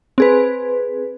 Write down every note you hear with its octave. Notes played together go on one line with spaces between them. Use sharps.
C4 G#4 B4